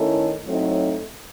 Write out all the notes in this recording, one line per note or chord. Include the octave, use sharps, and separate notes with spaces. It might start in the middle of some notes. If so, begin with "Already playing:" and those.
Already playing: D#3 A3 C#4 E4 A4
A2 F#3 A3 C4 D#4